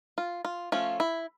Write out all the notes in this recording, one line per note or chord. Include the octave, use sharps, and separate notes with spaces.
F4
F4
F3 A3 C#4 F4
E4